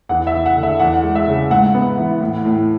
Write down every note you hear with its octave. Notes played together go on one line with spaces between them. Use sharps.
E2 F#5
E5
E2
F#5
D3
E5
E2 F#5
G#3
E5
C#3
G#2 F#5
B3
E3
A2
A2